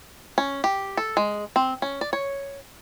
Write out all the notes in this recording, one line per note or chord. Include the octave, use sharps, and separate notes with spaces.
C#4
G4
A4
G#3
C4
C#4
D5
C#5